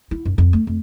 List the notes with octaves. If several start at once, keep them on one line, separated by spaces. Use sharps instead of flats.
E4
F#2
F2
A3
F2